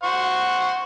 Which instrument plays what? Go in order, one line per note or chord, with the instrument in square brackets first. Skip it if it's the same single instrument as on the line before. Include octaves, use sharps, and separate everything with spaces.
[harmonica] C5 F#5 C#6